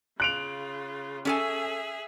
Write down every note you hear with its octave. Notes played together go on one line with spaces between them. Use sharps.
C#3 F4 F#6 D7 F7
C#4 G#4 A4 E5 G#5